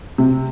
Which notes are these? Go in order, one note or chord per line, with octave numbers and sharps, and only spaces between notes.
C3